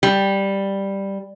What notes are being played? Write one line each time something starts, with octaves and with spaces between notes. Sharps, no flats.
G3